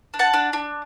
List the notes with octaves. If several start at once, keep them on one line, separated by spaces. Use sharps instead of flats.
D4
F#5 A5
D4
D4